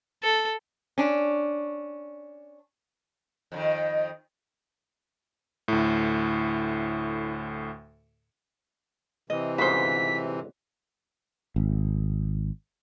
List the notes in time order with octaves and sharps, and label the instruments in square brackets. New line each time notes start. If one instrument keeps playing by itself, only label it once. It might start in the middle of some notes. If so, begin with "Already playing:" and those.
[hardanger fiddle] A4
[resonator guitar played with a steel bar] C#4 D4
[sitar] F2 D3 D#3
[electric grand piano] D2 A2 [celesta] E4
[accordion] C3 E3 [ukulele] D#5
[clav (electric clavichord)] G1 G#2 C#3 [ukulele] F#4 C5 [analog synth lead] B6
[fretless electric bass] G#1